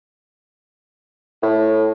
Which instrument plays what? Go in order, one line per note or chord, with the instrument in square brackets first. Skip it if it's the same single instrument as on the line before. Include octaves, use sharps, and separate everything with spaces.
[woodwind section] A2